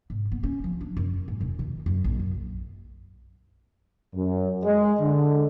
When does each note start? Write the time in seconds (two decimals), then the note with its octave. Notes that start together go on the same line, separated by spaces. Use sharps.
0.10 G#2
0.32 B3
0.43 C#4
0.64 F3
0.81 D4
0.97 F#2
1.28 G#2
1.41 E1
1.59 D#3
1.86 F#2
2.04 A#1
2.19 F#2
4.15 F#2
4.64 G#3
5.00 D3